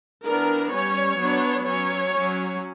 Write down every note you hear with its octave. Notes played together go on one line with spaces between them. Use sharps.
E3 B3 D4 A#4
G3 C#4 C#5
F#3 B3 D4
F#3 C#4 C#5
F#3 C#4